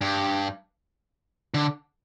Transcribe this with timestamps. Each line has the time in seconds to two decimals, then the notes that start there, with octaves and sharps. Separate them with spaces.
0.01 G2
1.54 D3